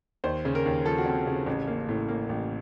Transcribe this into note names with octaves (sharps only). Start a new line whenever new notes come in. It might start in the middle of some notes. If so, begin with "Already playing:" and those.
D#2 C5
C#3
A#4
D#2
F3 A4
F#4
C4 A4
C#3
A1
A#3
A2
A#3
A1